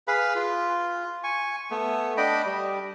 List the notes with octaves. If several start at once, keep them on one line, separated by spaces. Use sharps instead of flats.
G#4 B4 F5 B5
F4
G#5 C#6
A3 B3
D4 D#5 G5 B5
G3